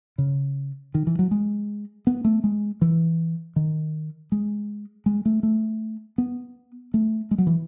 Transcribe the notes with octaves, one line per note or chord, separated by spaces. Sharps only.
C#3
D#3
E3
F#3
G#3
B3
A3
G#3
E3
D#3
G#3
G#3
A3
A3
B3
A3
G#3
F#3
E3